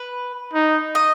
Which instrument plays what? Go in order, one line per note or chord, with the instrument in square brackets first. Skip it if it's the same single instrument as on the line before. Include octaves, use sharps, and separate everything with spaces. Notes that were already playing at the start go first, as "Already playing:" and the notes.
Already playing: [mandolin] B4
[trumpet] D#4
[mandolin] D#5